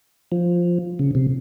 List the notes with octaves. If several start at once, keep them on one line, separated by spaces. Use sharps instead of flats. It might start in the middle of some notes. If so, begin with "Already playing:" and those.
F3
C#3
C3